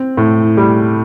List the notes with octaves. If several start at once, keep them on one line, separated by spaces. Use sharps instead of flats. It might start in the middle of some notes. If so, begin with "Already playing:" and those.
Already playing: C4
A2
G3